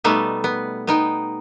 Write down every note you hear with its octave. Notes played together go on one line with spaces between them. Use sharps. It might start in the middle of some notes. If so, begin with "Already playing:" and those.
B2 G3 A3 B3 D#4
B3
B3 D#4 G5